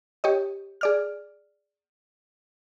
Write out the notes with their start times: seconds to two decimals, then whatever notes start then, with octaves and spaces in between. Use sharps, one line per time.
0.24 G4 C#5 D#5
0.81 G#4 D5 F6